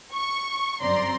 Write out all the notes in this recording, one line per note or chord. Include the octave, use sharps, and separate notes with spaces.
C#6
G1 F#2 C4 D5 A#5 C6